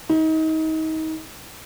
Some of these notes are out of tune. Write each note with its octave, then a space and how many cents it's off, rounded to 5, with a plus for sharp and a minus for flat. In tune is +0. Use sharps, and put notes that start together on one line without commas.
D#4 +30